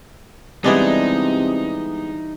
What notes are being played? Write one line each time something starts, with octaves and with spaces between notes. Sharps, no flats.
C3 E3 G3 G#3 B3 D4 D#4